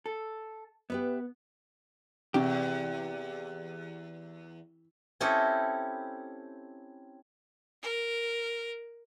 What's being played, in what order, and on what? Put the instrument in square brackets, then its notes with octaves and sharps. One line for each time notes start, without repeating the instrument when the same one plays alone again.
[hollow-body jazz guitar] A4
[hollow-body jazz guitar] B3 [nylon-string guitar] G4 B4 E5
[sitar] E2 [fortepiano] C3 [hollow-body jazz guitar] G4
[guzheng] C4 C#4 E4 G4 A4 D#5
[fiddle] A#4